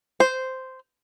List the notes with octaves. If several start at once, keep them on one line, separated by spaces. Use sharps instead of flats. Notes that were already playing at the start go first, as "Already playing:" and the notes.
C5